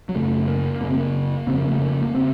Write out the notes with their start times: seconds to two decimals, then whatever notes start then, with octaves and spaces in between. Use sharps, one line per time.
0.09 F#3
0.15 F#2 C#3 A3
0.48 A#3
0.81 F#2 C#3 A#3
0.90 C4
0.98 A#3
1.47 F2 C#3 C4
1.58 A#3
1.69 A3
1.80 A#3
2.02 A#3
2.15 C#3 C4